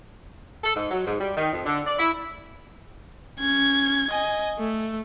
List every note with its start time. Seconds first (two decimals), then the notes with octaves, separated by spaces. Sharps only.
0.63 A4
0.74 G#2
0.90 F#3
1.05 G#2
1.20 G3
1.36 D#3
1.52 F2
1.65 D3
1.86 D5
1.99 E4
3.39 C#4 G#6
4.10 D#5 G#5
4.59 A3